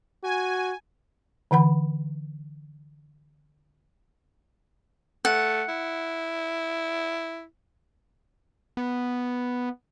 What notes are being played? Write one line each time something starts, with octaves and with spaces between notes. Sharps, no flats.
F#4 G#5
D3 E3 F#5 B5
A3 F#5
E4
B3